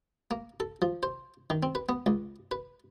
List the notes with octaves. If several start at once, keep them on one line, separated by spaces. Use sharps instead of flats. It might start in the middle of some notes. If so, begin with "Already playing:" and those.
A#3
A4
F3
C5
D#3
C4
B4
B3
C#2
B4